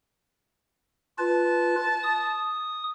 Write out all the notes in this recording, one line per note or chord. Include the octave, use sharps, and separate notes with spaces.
F4 B4 A5
D#6